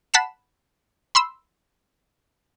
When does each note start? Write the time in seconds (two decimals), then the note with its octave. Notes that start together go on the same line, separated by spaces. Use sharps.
0.14 F#5 A5 B5 B6 C7 E7
1.15 B5 C6 E6